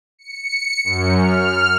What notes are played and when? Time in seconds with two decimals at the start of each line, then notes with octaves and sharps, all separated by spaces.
0.19 C#7
0.84 F#2
1.19 F6